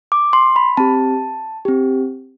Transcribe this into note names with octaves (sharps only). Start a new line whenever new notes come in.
D6
C6
B5
C4 G4 A5
C4 G4